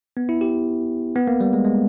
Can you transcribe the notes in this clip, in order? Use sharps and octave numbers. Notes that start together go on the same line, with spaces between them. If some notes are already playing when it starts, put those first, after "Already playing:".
B3
E4
G4
B3
A#3
G3
G#3
G#3